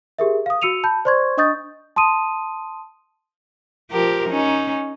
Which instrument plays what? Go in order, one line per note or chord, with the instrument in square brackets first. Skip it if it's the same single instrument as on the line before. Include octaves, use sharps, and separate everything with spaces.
[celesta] G4 G#4 A#4 E5
F5 D#6
F#4 E6 C#7 D#7 F7
A5 B5 G6
C5 D5 C6 C#6 G#6
D4 D#5 C#6 D#6 G6 A6
A5 C6 D#6 D#7
[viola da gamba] F3 G4 A#4
C#4 D#4